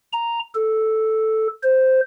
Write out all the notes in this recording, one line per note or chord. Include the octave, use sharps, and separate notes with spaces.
A#5
A4
C5